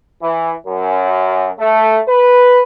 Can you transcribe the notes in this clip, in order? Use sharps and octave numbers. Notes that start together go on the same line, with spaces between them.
E3
F#2
A3
B4